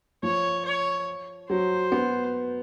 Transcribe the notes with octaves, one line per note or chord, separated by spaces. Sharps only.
F3 C#5
C#5
F#3 C5
B3